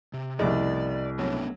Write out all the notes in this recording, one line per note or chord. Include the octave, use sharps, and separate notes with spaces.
C3
C2 F2 A2 C#3 D5 D#5
F#3 A3 B3 C#4 D4